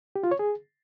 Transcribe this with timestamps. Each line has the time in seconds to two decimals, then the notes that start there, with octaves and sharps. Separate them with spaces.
0.16 G4
0.23 F4
0.31 C#5
0.39 G#4